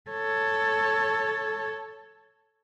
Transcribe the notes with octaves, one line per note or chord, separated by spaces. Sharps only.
A4 C#5